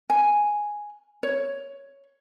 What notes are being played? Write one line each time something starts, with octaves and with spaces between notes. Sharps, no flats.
G#5
C#5